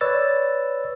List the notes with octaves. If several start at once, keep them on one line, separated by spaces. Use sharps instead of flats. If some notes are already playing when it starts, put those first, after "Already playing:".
B4 C#5 D5 E6 A6